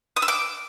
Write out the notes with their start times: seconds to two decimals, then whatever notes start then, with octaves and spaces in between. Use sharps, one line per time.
0.16 D#6
0.22 E6
0.28 D6